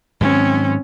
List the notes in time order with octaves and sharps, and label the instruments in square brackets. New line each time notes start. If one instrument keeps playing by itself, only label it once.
[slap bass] G#2 D#3 F#3 [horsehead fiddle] C4 C#4